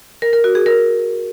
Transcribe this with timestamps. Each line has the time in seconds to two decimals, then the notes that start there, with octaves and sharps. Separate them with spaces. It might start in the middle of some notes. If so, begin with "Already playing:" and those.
0.22 A#4
0.33 A#4
0.44 F#4
0.55 G#4
0.66 A#4